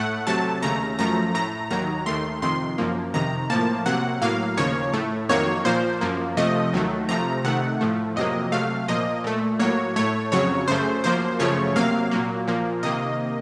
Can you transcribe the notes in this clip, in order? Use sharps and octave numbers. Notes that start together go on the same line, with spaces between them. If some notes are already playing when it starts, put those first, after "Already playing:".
Already playing: A2 A3 F#5
C3 F#3 A3 A5
D#2 C#3 A3 A#5
F#2 F3 A3 A#5
A2 A3 A#5
D#2 D#3 F#3 A#5
D#2 D#3 A3 C6
F2 C3 D#3 C6
F#2 F3 A#3
F2 C3 D#3 A#5
A2 F3 A#3 A5
C3 F#3 A#3 F#5
A2 F#3 A#3 F5
D#2 C#3 F3 A#3 C#5
A2 A3
F2 D#3 F#3 A#3 C#5
A#2 F3 A#3 C5
F#2 F3 A#3
C3 F3 A3 D#5
D#2 D#3 F#3 A3
C3 F3 A3 A#5
C3 D#3 A3 F#5
A2 F3 A3
F2 C3 F#3 A#3 D#5
C3 F#3 A3 F5
A#2 F3 A#3 D#5
A#2 A3
A2 F#3 A#3 C#5
A2 A3 C#5
F2 C#3 F#3 C#5
F#2 C#3 A3 C5
F#2 F3 A#3 C5
F#2 C#3 F3 A3 C#5
C3 F#3 A#3 F5
A#2 F#3 A#3
A#2 F3 A#3
C3 D#3 A#3 D#5